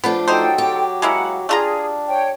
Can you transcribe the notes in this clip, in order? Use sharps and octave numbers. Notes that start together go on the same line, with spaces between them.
F3 A3 B3 D4
F#3 D#4 A4 C5 G5
G4
G#3 A#3 E4 F#5
A3 D4 F4 G#4 A#5
C#5 G5